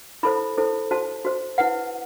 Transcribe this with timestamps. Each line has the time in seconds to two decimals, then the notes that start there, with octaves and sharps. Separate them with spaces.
0.23 E4 A4 C5 B5
0.58 E4 A4 C5
0.91 F#4 C5 A5
1.25 F#4 C5
1.58 E4 B4 F#5